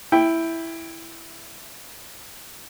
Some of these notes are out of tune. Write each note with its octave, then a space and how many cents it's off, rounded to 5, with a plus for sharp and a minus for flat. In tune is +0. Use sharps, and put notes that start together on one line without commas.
E4 +0 G5 +10